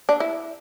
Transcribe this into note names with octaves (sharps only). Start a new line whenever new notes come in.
D4
E4